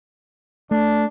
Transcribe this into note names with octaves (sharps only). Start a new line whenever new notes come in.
A3 D4